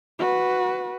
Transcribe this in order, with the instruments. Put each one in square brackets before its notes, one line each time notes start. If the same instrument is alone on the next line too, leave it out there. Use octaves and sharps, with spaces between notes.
[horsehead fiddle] F#4 B4